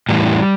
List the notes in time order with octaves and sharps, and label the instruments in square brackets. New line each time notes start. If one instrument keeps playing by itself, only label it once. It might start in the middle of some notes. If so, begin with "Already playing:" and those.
[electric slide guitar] A2 E3 G3